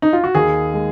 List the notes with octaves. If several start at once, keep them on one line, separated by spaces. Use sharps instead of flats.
D#4
F4
F#4
D#2 G#4
G#3